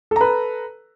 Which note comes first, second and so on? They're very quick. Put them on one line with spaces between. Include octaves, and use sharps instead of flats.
A4 A#5 B4